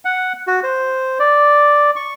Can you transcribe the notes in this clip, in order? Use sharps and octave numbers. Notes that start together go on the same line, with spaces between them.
F#5
F#4
C5
D5
C#6